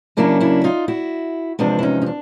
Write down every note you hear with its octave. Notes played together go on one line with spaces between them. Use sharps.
C#3 F#3 A#3 C#4 D4 E4
D4 E4
D#4 F4
E4 F#4
E2 C3 F3 G#3 B3 D4 E4
E4
C#4 D#4
D#4
D4